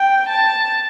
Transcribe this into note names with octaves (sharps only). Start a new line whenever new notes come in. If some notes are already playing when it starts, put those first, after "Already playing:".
Already playing: G5
A5